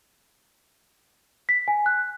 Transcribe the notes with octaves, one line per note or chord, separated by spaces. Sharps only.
B6
G#5
F#6